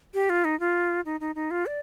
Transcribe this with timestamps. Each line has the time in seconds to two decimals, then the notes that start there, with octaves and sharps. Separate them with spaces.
0.14 G4
0.29 F4
0.44 D#4
0.60 F4
1.05 D#4
1.20 D#4
1.35 D#4
1.51 F4
1.66 D5